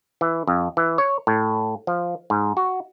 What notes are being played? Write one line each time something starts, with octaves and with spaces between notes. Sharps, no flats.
E3
F2
E3
C#5
A2
F3
G#2
F#4